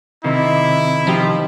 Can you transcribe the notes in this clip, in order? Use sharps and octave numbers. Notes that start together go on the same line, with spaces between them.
C3 D#3 D#4 E4
F3 D#4 G4